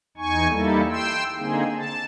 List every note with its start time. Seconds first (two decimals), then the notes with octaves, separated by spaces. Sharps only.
0.17 E2 D#4 G#5 C#6
0.49 G3 A#3 D#4 E4 A4
0.90 G5 C6 E6
1.37 D3 A#3 C4 D#4 G#4
1.76 A5